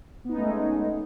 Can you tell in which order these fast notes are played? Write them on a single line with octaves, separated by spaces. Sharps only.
B3 D#4 C#4 A3 G#3